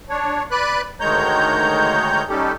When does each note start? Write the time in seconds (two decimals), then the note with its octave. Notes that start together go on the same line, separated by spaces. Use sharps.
0.09 D4 C#5
0.51 B4 D5 B5 F#6
1.00 D2 D#3 G#3 C#5 A#5 G6
2.29 G3 C#4 D#4 G4 A4